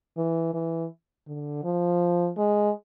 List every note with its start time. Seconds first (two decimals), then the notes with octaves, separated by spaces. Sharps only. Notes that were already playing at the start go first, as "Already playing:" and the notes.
0.17 E3
0.53 E3
1.27 D3
1.64 F3
2.38 G#3